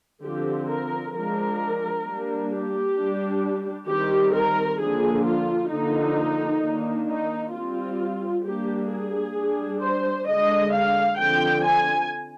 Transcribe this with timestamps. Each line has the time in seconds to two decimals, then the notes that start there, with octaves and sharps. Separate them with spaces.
0.23 D3 F3 C4 G4
0.68 A#4
1.14 F3 G#3 D4 A#4
2.05 G3 A#3 D4
2.51 G4
2.97 G3 D4
3.88 D#3 G3 C4 G4
4.34 A#4
4.80 D3 F3 A#3 D4 G#4
5.25 F4
5.71 D3 F3 A#3 D#4
6.62 D#3 A#3 D4
7.08 D#4
7.53 G3 C4 F4
8.45 G3 A#3 D4 G4
8.90 G#4
9.36 G3 D4
9.81 C5
10.27 D3 G#3 D4 D#5
10.73 F5
11.18 D3 F3 C4 G5
11.64 G#5